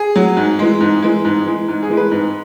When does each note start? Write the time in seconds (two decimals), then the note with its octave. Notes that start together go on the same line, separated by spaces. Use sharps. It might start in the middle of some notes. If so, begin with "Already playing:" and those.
Already playing: G#4
0.16 F#3
0.37 G#2
0.59 E3 G#3
0.80 G#2
1.03 E3 G#3
1.25 G#2
1.46 E3 G#3
1.68 G#2
1.83 G#4
1.90 E3 G#3
1.97 B4
2.11 G#2